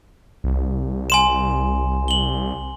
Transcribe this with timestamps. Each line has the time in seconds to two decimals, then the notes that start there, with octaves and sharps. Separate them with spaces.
0.44 C2
1.10 G#5 C6 E7
2.08 F#7 G7